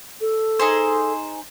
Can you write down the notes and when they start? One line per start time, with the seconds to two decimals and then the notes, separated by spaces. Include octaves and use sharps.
0.21 A4
0.60 D#4 G#4 C5